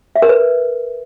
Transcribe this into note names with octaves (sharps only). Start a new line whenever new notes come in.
E5
A#4
B4